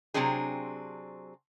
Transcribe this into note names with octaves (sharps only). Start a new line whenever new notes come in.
C3 E3 F#3 C4 D4 G#4